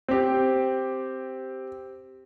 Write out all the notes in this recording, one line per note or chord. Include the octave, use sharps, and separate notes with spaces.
C4 G4